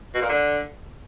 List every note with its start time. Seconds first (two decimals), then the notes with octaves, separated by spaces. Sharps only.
0.14 B2
0.22 A#2
0.29 D3